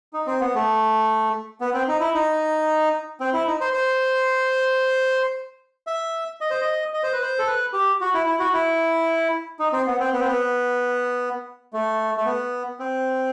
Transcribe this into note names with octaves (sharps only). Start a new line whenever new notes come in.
D#4
C4
B3
A3
B3
C4
D#4
E4
D#4
C4
E4
D#4
C5
C5
E5
D#5
C5
D#5
D#5
C5
B4
C5
A4
B4
G4
F#4
E4
E4
F#4
E4
D#4
C4
B3
C4
B3
C4
B3
A3
A3
B3
C4